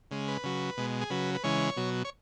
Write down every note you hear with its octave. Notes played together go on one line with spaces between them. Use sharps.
C#3 G#3
B4
C#3 F#3
B2 G#3
G#4
C#3 F#3 B4
B4
C#3 E3 G#3 C#5
B2 F#3
C#5